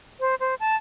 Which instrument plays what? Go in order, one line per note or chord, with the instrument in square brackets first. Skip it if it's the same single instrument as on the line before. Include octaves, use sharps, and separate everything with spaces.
[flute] C5
C5
A5